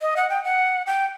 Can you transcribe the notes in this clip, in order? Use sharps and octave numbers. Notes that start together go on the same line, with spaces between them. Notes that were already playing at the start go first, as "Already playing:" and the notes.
D#5
F#5
G5
F#5
G5